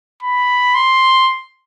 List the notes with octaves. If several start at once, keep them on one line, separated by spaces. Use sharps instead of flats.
B5
C6